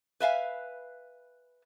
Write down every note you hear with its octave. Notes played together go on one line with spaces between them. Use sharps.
B4 E5 F5 G#5